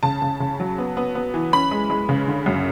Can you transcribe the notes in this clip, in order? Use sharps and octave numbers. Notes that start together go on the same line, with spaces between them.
C#3 A5
C#3
C#3
F#3
B3
B3
B3
E3
C#4 B5
G#3
G#3
C#3
D3
F#2